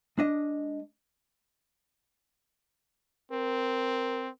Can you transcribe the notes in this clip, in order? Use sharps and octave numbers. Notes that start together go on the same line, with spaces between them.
G#3 D4 D#5
C4 A#4